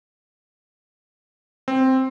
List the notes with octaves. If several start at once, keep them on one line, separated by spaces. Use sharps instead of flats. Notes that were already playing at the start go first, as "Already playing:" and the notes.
C4